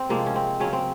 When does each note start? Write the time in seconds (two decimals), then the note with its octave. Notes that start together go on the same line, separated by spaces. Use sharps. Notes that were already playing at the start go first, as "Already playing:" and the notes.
Already playing: C4
0.09 C3 F3 G#3 A#3
0.26 C#4
0.36 C4
0.60 C#3 F#3 C#4
0.73 C4